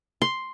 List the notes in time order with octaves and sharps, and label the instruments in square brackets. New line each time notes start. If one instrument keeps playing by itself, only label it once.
[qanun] C6